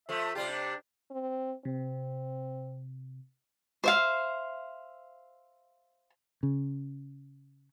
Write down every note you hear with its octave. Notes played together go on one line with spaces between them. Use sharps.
F3 A3 E5
C3 G3 F4 G4
D4
C4
C3 C4
C5 E5 F5
C#3